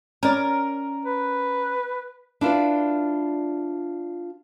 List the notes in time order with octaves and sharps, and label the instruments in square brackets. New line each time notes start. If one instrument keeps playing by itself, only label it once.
[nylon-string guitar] C#4 D5 [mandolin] A#4
[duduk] B4
[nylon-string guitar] D4 E4 F4 B4 D5